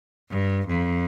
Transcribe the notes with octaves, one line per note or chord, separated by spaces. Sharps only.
G2
F2